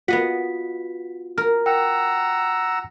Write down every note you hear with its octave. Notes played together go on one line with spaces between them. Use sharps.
B3 F4 F#4 D#5 F#5 B6
A#4 F6
F#5 G5 A#5 E6